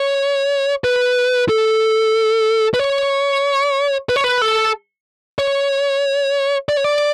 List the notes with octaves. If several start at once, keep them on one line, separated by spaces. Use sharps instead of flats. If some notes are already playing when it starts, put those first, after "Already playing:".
Already playing: C#5
B4
A4
B4
C#5
B4
C#5
B4
A4
C#5
D5
C#5
D5